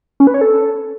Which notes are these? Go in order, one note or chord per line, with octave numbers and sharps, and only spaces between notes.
C#4
B4
C#5
A4